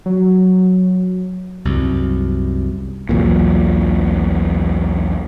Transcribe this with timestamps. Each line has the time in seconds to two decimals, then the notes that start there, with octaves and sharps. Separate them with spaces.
0.06 F#3
1.65 C2 F#2
3.09 B1 E2 A#2